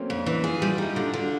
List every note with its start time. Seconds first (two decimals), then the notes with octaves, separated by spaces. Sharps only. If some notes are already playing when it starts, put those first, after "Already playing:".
Already playing: F#3 A3 A#3 C4 C#4
0.10 F2
0.18 D4
0.26 E3
0.44 F4 G#4
0.57 G3 G4
0.70 F#4
0.78 D#4 E4
0.96 D3 F4
1.14 D3
1.22 F#4